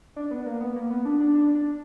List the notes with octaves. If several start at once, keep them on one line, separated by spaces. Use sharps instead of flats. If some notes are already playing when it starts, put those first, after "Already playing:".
D4
B3
A#3
B3
A#3
B3
D4
D4
D4
D4